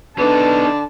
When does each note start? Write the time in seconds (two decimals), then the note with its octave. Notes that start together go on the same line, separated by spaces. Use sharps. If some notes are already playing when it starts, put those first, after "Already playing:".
0.19 D3 B3 D4 D#4 B4 A5